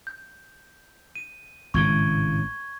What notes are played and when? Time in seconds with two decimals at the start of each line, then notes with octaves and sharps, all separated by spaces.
0.07 G6
1.15 D#7
1.74 G#1 A2 C#3 C#6 G#6 G7